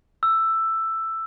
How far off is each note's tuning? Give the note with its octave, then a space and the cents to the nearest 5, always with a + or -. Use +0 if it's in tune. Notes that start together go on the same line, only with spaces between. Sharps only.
E6 +10